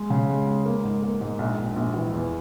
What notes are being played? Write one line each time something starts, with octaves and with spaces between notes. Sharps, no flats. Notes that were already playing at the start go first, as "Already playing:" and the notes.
Already playing: G#3
C#3
G#3
G#3
A#3
G#2
A#3
G#2
A#1
A#1
A#1
E3
E2